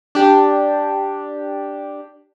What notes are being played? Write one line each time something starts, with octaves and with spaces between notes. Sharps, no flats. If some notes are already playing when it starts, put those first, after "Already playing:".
D4 G4